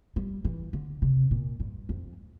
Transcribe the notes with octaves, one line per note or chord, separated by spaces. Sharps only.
G3
E3
D3
C3
A#2
G2
F2